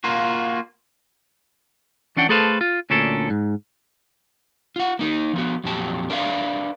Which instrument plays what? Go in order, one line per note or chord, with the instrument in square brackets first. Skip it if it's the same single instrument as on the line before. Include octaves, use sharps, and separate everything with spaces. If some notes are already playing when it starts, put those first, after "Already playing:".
[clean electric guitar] A#3 F4 F#4
E3 C#4 D4 F#5 G5
A3 G#4 A4 B4 C5 F5
F4
D2 A#2 C#4 D4 A4
G#2
[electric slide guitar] F4 F#5
A#3 D#4 A#4
F3 B3 F#4
F2 A#2 F#3 C4 G4 A5
D4 A#4 B4 E5 F5